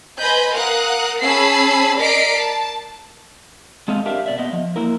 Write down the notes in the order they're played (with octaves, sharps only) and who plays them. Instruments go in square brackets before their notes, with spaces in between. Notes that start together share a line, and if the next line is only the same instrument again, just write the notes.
[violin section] B4 C5 D#5 G#5 B5 G6
A#4 F5 F#5 D#6 F#6
C#4 G#4 A5 B5 E6 C7
A#4 D5 D#5 B6 C7 D7
A5
[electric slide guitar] G#3 A3 C4 A4 D#5 F5
D4 G4 A#4 E5 F5
B2 D5 E5
B3 D#5 E5
F3
A#3 E4 A#4